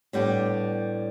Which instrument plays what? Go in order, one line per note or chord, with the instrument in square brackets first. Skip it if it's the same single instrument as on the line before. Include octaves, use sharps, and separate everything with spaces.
[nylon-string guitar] A2 G3 B3 D4